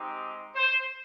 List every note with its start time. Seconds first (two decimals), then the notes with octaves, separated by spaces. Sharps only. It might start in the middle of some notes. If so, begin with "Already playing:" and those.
Already playing: G#3 C4 D#4 G4
0.55 C5